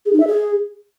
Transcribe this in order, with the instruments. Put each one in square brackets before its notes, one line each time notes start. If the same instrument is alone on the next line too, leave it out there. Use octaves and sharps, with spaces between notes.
[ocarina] G#4
D#4
E5
G#4